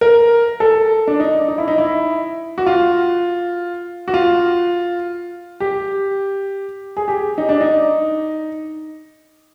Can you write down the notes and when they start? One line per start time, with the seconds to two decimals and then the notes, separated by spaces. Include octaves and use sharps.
0.01 A#4
0.60 A4
1.07 D4
1.20 D#4
1.48 D#4
1.58 E4
1.68 D#4
1.78 E4
2.58 F#4
2.67 F4
4.08 F#4
4.14 F4
5.60 G4
6.97 G#4
7.08 G4
7.38 D#4
7.49 D4
7.61 D#4